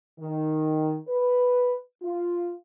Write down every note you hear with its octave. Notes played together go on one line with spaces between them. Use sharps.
D#3
B4
F4